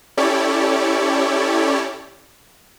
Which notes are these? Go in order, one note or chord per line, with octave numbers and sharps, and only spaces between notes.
C#4 E4 G4 A4 C#5 D5